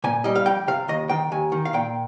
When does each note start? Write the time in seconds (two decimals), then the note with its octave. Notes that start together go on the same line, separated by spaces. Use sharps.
0.04 A#2 G#5
0.24 G3 D#5
0.35 F5
0.46 F2 G5
0.67 C3 F5
0.88 D#2 D#5
1.09 D#3 G5
1.32 D#2 G#5
1.52 D#3
1.65 F5
1.73 A#2 G5